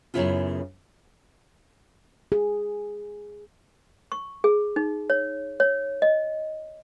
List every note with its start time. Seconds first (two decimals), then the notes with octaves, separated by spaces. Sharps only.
0.14 F#2 A2 C#3 B3 E4 F4
2.32 G#4
4.12 C#6
4.44 G#4
4.76 D#4
5.10 C#5
5.60 C#5
6.02 D#5